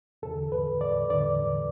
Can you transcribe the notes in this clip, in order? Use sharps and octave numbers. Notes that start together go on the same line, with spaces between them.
E2 D3 A4
B4
D5
E2 D3 D5